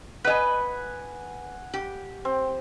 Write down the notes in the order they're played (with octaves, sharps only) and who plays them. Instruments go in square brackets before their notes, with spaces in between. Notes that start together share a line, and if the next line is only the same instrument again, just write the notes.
[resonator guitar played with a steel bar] B4 D#5 [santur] F#5 G#5
[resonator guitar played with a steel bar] G4
[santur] C4